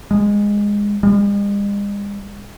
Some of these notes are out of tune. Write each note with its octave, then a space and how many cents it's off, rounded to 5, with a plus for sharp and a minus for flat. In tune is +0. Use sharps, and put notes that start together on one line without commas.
G#3 -15
G#3 -45